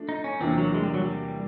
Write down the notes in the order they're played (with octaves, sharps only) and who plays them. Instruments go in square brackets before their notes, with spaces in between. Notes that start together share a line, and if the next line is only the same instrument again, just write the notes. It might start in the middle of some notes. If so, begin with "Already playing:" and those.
Already playing: [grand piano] F3 A3 D4
[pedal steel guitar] D#4
C#4
[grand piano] E2 C3 F3 A#3 D4 [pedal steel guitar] C4
[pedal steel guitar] F#3
G#3
G3
F#3
G3